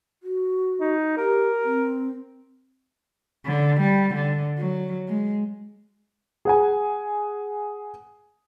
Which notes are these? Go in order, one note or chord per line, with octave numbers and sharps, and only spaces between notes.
F#4
D#4
G4 A#4
C4
D3
G3
D3
F#3
G#3
G#4 F#5 G#5